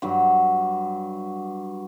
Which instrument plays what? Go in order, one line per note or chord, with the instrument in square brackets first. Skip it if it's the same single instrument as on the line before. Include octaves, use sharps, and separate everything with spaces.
[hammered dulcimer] G2 F#3